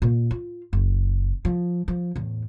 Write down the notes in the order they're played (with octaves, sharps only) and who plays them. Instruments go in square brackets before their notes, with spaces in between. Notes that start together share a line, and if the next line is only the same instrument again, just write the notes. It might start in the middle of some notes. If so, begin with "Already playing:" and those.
[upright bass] A#2
F4
F#1
F3
F3
E2 A2